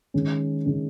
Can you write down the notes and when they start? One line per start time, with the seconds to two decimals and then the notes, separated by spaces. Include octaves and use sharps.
0.14 D#3 G#3 C#4
0.66 D#3 G#3 C#4